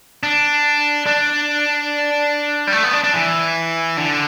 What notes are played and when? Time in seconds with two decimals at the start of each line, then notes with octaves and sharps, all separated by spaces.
0.23 D4
1.06 D4
2.67 G3
2.72 A3
2.83 B3
2.93 D4
3.04 D4
3.14 E3
3.97 D3